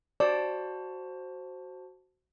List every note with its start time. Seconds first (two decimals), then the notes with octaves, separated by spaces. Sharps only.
0.20 F#4 C5 D5 A5